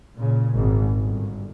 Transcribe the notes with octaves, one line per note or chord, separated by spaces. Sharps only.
A#2 C#3
G#1
G1